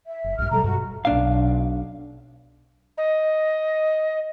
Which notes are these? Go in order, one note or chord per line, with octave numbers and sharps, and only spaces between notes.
E5
F#1
A#1 G2 F6
B2 F#3 G3 A4 A#5
G2 B2 F#4
B1 D4 F5
D#5